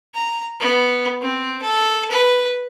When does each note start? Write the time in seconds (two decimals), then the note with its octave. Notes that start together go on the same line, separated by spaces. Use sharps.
0.14 A#5
0.60 B3
1.21 C4
1.62 A4
2.11 B4